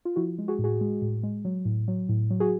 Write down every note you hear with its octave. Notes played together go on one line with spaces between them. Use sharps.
F4
F3 E4 F#4
G#3
F#4 G#4
A2
F#4 G#4
G#3
A2
G#3
F#3
A2
F#3
A2
F#3
F#4 G#4